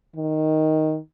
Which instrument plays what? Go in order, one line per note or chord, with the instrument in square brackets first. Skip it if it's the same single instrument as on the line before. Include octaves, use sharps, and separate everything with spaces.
[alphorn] D#3